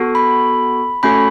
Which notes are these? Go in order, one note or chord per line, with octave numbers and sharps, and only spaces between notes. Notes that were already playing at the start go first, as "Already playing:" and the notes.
Already playing: B3 F#4 A4
B5
A3 C#4 F#4 A4 B5